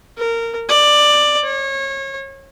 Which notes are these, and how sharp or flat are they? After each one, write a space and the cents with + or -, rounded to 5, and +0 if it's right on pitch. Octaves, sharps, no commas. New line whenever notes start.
A#4 -20
D5 +10
C#5 -30